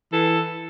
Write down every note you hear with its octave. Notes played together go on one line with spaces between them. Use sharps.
E3 A4